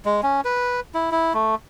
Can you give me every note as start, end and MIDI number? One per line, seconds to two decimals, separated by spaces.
0.05 0.21 56
0.23 0.41 61
0.45 0.80 71
0.94 1.10 64
1.11 1.33 64
1.34 1.55 57